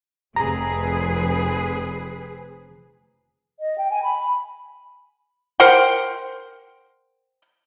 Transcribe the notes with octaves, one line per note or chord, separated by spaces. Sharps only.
F1 C4 G#4 B4 A#5
D#5
G5
G#5
B5
A#4 C5 F#5 G5